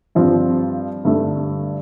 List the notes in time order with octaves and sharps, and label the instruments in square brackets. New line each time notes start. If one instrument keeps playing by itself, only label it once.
[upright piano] G2 F3 C4 F4
G2 D3 A3